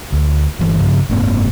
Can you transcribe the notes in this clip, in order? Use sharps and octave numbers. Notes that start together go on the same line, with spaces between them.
D2
G1 E3
G2 C#3 F3
F#1 G#2 A#3 C4